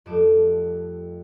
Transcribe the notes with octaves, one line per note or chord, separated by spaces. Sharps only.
F2 G3 A3 D6 E7